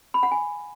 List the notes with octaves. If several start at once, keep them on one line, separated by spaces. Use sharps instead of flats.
B5
F#5
G#5